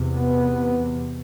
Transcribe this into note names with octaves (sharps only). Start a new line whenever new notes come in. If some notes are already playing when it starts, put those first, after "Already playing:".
Already playing: E2 C3
B3